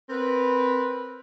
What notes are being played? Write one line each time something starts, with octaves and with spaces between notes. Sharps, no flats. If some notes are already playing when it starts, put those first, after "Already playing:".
C4 A#4 B4